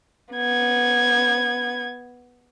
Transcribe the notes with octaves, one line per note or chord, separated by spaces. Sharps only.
B3 G#6